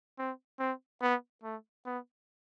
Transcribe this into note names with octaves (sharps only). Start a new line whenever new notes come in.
C4
C4
B3
A3
B3